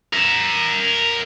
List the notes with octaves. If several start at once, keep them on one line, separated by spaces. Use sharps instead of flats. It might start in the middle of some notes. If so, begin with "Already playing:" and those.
A#4 E5